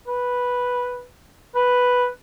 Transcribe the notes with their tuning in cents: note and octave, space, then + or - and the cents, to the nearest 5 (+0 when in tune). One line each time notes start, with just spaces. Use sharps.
B4 -5
B4 +0